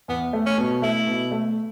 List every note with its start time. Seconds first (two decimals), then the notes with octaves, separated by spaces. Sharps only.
0.08 E2 B3
0.33 A3
0.46 C#4
0.58 B2
0.82 A3 E4
1.07 B2
1.31 A3